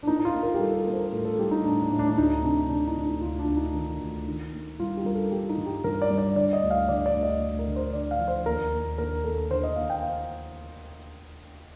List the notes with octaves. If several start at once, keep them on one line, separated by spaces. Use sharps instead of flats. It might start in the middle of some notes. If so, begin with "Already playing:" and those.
D4
A#3 D#4
D#4
F4
A#3
A#4
G4
G3 A4
A#4
A4
A#3 A#4
C5
A#4
A2 A4
A4
G3 G4
D#4
A2 D4
D4
A2
D4
D4
D2 D#4
C3 D4
C3 D4
D#4
D2
D#4
D2 F4
D4
D2
D#4
D#3
D2
D#3
A#3
G3 F4
G4
G3 A#4
A4
G3 G4
D#4
G2
G4
G2 A#4
D5
G3
D5
D3 D5
D#5
D2
F5
D3 D5
D5
D2
D#5
D2
A#4
D3
C5
D3 D5
F5
F3
C5
D#2 A#4
D#2
D#2 A#4
D#2 A4
D3 C5
D#5
D#2 F5
G5
F5